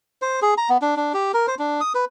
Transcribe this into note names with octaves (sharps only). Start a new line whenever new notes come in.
C5
G#4
A#5
B3
D4
D4
G4
A#4
C5
D4
D#6
B4